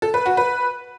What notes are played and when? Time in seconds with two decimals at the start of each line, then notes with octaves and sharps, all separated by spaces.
0.02 A4
0.14 B4
0.26 F#4
0.37 B4